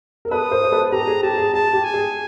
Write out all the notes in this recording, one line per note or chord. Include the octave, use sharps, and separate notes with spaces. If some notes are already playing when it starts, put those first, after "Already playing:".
A#4
A4 B4 D#6
A#4 C5
C5
A4 B4
G4 A4 A#5
G#4
G4 A5
G#4
G#4 A5
G4
G#5
G#4